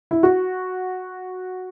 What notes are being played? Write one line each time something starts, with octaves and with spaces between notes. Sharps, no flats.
E4
F#4